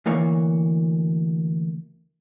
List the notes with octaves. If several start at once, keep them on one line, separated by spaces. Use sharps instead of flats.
D2 E3 A#3 C#5